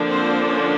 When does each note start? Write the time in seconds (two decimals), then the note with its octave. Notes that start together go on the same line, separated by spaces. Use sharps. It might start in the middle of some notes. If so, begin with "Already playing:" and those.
Already playing: D3 F3 A#3 D4
0.09 C4 C5
0.48 C#4